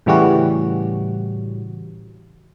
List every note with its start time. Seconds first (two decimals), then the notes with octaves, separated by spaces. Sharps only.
0.06 A2 C#3 E3 G3 C#4 F#4